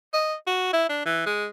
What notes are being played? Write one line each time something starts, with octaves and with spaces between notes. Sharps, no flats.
D#5
F#4
E4
D4
E3
G#3